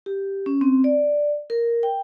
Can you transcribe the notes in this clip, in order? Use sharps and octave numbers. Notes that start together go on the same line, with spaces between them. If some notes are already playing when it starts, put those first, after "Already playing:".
G4
C#4
C4
D5
A#4
G5